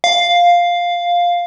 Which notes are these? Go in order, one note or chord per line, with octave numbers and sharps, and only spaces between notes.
F5